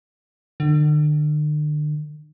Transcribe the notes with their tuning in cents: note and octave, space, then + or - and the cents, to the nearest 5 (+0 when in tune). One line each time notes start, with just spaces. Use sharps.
D3 +40